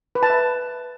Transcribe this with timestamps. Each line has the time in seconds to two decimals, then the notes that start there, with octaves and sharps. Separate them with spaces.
0.15 B4
0.23 A5
0.30 E5